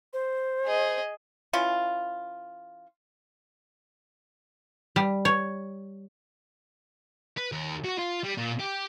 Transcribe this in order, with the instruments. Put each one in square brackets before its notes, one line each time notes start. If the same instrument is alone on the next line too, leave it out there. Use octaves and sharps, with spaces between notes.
[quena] C5
[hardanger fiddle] G#4 D#5
[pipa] E3 C#4 F4
[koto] G3
C#5
[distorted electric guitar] B4
D#2
F#4
F4
G3
A#2
G4